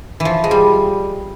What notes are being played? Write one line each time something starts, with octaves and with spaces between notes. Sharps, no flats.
E3
F3
G#3
G3